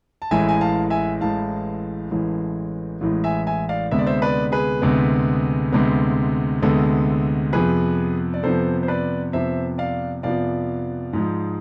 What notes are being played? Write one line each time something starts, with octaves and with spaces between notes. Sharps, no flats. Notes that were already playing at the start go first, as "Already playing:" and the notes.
A5
A1 A2 E3 G#3 E5 G#5
G#5
F5 A5
E5 G#5
A1 A2 E3 G#3 F5 A5
A1 A2 E3 G#3
A1 A2 E3 G#3
E5 G#5
E5 G#5
D5 F5
D2 C3 G#3 B3 E5
D5
C5 E5
B4 D5
G#4 B4
D2 C3 G#3 B3
D2 C3 G#3 B3
D2 C3 G#3 B3 A4
F2 C3 F3 B3 G#4 B4
D5
F2 C3 F3 B3 A4 C5
C5
B4 D5
F2 C3 F3 B3 C5 E5
D5 F5
F2 C3 F3 B3 D5 F5
G#2 F3 G#3